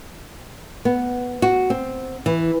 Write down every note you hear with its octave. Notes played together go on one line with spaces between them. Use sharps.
B3
F#4
C4
E3